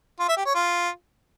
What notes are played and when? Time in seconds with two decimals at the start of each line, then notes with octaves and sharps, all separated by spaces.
0.20 F4
0.28 E5
0.37 G4
0.46 C#5
0.55 F4